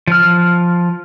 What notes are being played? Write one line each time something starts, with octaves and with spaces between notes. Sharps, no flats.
F3 F6